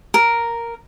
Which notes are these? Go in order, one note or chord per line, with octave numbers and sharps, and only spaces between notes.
A#4